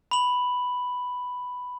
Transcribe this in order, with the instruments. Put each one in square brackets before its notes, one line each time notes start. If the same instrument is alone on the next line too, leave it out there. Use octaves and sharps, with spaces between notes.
[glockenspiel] B5 F#7